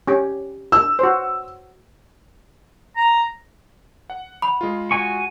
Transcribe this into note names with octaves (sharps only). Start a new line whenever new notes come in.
C#4 G4
E6
F#4 C5
A#5
F#5
B5
G#3 F4
F#4 G#5 C#6